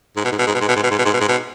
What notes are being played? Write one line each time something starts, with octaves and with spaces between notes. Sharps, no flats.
G#2
B2
G#2
B2
G#2
B2
G#2
B2
G#2
B2
G#2
B2
G#2
B2
G#2
B2